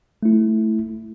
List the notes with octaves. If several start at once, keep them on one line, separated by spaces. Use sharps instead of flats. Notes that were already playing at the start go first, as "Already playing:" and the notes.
A3 E4